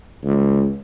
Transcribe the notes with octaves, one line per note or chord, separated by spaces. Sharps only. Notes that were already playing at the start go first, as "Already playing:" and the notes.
C#2